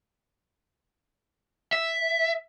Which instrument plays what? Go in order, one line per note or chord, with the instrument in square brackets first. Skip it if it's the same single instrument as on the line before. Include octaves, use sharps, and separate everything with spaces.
[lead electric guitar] E5